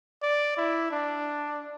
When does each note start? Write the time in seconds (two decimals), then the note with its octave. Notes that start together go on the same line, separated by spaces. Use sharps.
0.22 D5
0.57 E4
0.91 D4